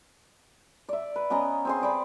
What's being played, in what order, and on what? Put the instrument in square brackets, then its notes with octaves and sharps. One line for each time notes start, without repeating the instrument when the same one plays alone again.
[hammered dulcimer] D5 E5
B4
B3 C#4 D#5 A#5
C4 G#4 C6
G4 D5 B5